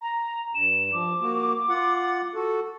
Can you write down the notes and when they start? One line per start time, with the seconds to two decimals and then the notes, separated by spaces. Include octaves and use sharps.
0.01 A#5
0.54 G2 E7
0.92 F3 D6
1.21 A#3 F#4
1.69 F4 F#5
2.35 F#4 A4